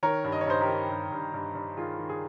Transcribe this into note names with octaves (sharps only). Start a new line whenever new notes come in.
D#3 A#4 C#5
G2
D#5
C#5
G2 C5 D#5
G4 A#4
D#3
G2
G2
G2
G2
D#3 F4 G#4
D#3
G#4